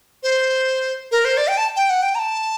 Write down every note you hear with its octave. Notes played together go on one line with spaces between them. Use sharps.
C5
A#4
C5
D5
G5
A5
G5
F#5
G5
A#5
A5